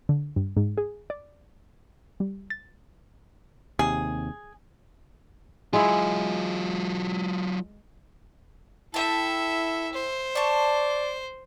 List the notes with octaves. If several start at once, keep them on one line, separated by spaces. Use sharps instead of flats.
D3
G2
G#2
G#4
D5
G3
A6
D#2 C3 G#4
F#3 G#3 E4 F4
E4 A4 E5 G5 A5
C5
D5 A5 C#6